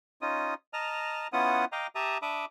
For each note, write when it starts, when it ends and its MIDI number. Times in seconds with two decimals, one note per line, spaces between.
0.22 0.54 61
0.22 0.54 63
0.22 0.54 65
0.22 0.54 87
0.73 1.27 75
0.73 1.27 81
0.73 1.27 82
0.73 1.27 89
1.33 1.65 59
1.33 1.65 61
1.33 1.65 64
1.33 1.65 65
1.33 1.65 78
1.33 1.65 87
1.72 1.87 75
1.72 1.87 77
1.72 1.87 79
1.72 1.87 82
1.72 1.87 86
1.95 2.18 67
1.95 2.18 76
1.95 2.18 81
1.95 2.18 82
1.95 2.18 87
2.22 2.45 62
2.22 2.45 76
2.22 2.45 83
2.22 2.45 86
2.22 2.45 87